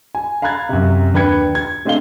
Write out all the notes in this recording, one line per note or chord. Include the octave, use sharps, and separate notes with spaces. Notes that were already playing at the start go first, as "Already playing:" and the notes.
G#5
F5 A#5 B5 F#6 G#6 A6
F#2 C3
D#2 D4 B4 G5 G#6 C#7
G#6
A3 C4 D4 D#5 F5 G7